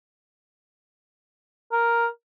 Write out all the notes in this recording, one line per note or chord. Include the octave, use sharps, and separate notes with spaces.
A#4